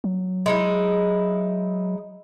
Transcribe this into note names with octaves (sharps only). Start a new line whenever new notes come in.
F#3
G#3 D#4 E4